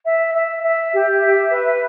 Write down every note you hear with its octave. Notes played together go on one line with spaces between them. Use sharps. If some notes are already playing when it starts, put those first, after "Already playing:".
E5
E5
E5
G4
E5
B4